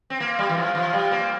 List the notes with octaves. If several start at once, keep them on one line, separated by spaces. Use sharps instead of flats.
C4
A#3 C4 F4 C5 F5
G3
E3
F3
F3
G3
A#3